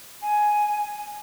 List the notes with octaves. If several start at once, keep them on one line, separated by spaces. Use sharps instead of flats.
G#5